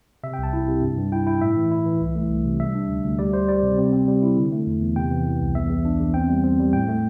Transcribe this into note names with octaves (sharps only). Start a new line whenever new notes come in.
C3 E5
G5
C2
A5
E4
C3
G2
G2
E4 G5
E4 G5
A2 E5
E3
E4
E3
C2
A3
C2
C3
G3 E5
D4
D2
D2
G3 D5
G3 C5
G3 D5
C3
C4
C4
G3
E4
D3
A3
E2
E2
C3 G5
E3
E3
C2
E2 E5
E2
D4
E2
C4 G5
G3
C4
G3
A2 G5
A3